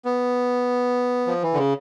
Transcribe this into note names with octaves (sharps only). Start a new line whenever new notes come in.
B3
F3
E3
D3
C#3